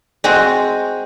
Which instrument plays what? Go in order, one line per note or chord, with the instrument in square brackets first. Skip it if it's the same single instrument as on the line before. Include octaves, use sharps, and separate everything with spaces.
[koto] G#3 C4 F#4